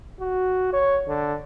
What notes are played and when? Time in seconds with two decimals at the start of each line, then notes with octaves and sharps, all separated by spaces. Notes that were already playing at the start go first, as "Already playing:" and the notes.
0.20 F#4
0.73 C#5
1.08 D3